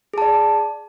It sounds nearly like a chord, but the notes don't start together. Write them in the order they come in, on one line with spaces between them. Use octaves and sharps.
G#4 A5 D5